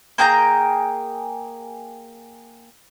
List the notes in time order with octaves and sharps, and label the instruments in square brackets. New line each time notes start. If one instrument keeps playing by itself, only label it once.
[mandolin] A#3 G#4 G5 A#5